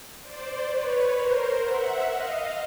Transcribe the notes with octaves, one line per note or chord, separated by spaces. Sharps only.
C5 D5
B4 C#5
A#4 C5
E5 F#5
D#5 F5